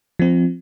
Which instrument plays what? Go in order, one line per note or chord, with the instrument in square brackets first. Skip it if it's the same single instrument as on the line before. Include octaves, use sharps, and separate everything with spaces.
[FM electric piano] F3 C4